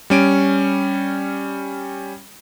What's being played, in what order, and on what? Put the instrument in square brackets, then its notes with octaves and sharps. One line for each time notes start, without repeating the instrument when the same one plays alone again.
[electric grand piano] G3 C#4 D7